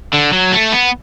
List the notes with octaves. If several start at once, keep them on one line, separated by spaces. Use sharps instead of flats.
D3
F#3
A3
B3